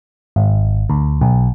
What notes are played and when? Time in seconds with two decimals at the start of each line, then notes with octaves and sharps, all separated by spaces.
0.36 G#1
0.90 D2
1.21 B1